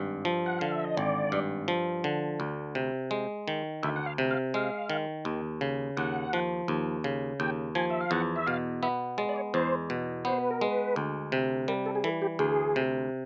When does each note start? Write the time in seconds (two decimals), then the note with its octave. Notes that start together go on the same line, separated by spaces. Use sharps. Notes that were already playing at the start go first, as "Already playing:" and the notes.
Already playing: G#1 G2
0.25 F3
0.46 F#5
0.59 D3 F5
0.72 E5
0.84 D#5
0.97 G#1 D5
1.32 G2
1.68 F3
2.04 D3
2.40 D2
2.75 C3
3.11 G#3
3.48 D#3
3.83 D2 E5
3.96 F#5
4.06 F5
4.18 C3
4.31 F5
4.54 G#3 F5
4.90 D#3
5.25 D#2
5.61 C#3
5.97 D#2 F#5
6.33 F3
6.68 D#2
7.04 C#3
7.40 D#2 G5
7.75 F3 G#5
7.90 E5
8.01 F5
8.11 E2 F#5
8.36 E5
8.47 B2 F5
8.82 B3 E5
9.18 G#3 D5
9.29 D5
9.36 C#5
9.54 E2 C5
9.90 B2
10.25 B3 C5
10.38 B4
10.51 A#4
10.61 G#3 B4
10.96 D2
11.32 C3
11.68 G3 A#4
11.86 A4
11.95 G#4
12.04 E3 A4
12.22 G4
12.39 D2 G#4
12.76 C3